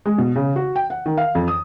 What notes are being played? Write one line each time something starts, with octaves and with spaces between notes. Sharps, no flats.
G#3
B2
C#3
F#4
G5
F#5
D#3
F5
F2
D#6